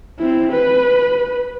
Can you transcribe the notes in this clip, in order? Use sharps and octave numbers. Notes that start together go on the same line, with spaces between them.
C4 E4
B4